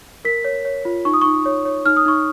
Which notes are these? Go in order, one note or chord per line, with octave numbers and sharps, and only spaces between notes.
A#4 B6
C#5
C#5
F4
D#4 C#6
D#6
D#4 C#6
C#5
C#5
D#4 F6
D#6
D#4 C#6